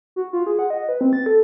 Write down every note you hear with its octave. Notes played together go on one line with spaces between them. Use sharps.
F#4
F4
G#4
F#5
D#5
B4
C4
A6
A4